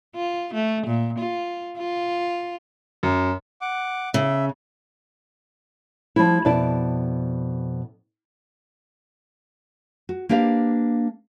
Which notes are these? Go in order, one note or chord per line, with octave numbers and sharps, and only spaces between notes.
F4
A3
A#2
F4
F4
F#2
F#5 D6
C#3 E5
F3 G3 E4
F2 B2 E4 D5 A5
F#4
A#3 D4 G4 B4 F5